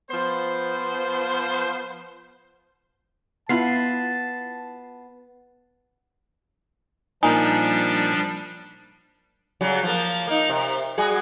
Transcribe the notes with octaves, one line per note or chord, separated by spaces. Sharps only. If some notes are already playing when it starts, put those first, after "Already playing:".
F3 B3 C5
B3 E4 F4 A5 C7
A#2 F3 G3 D4 D#4 G#5
C#3 F#3 G3
F3 A#3
A#3 D#4
C3
G3 F#4 G#4